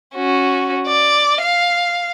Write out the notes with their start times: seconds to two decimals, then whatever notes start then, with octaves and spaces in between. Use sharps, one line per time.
0.15 C#4 F#4
0.87 D5
1.42 F5